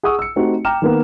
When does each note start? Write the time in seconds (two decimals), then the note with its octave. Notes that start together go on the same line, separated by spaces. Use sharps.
0.03 G#4 F#5 C#6 D#6 E6
0.19 E6 C#7
0.36 A3 C4 D#4 F#4 G4
0.65 G5 A#5 D6 F6 E7
0.82 D#3 A#3 B3